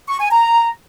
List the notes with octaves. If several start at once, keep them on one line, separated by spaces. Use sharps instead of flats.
C#6
G#5
A#5